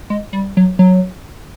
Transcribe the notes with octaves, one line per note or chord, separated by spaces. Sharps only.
G#3
G3
F#3
F#3